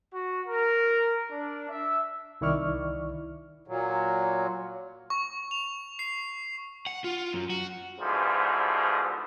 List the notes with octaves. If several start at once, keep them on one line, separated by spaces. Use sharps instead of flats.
F#4
A#4
D4
E5
C2 D#3 E4 D5 C#6 F6
A#2 F#3
C#6
F7
C7
F#5
F4
F#2
F#4
G#2 B2 D3 E3 F3 G3